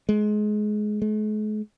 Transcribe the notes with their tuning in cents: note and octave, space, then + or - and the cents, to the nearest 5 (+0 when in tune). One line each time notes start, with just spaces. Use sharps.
G#3 +20
G#3 +45